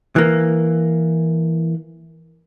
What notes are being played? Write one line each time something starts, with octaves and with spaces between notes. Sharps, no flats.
E3 A#3